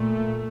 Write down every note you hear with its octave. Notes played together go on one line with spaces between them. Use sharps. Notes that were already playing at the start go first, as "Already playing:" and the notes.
Already playing: A#2 A3